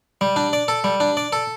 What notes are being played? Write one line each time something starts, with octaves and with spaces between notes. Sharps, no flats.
G3
D4
D5
A4
G3
D4
D5
A4